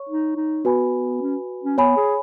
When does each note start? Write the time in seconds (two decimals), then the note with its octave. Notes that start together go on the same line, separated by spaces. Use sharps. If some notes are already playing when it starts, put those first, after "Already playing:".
Already playing: C#5 C#6
0.09 D#4
0.36 D#4
0.65 B3 F#4 B4 G#5 B5
1.21 C#4
1.64 C#4
1.78 B3 C#5 G#5 B5
1.97 G#4